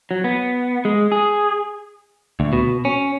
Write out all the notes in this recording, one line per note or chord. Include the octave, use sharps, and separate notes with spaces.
F#3
B3
G#3
G#4
D2
B2
C#4